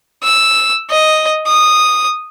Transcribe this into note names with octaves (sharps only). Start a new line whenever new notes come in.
E6
D#5
D#6